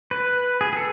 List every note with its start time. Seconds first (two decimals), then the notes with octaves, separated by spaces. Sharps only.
0.11 B4
0.61 G#4
0.73 G#4 A4